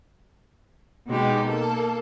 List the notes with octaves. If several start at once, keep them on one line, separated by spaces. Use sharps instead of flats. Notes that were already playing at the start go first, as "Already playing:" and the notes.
B2 G#3 D#4 G4
A#3 A4